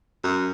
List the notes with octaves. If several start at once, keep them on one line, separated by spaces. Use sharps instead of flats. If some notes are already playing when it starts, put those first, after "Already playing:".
F#2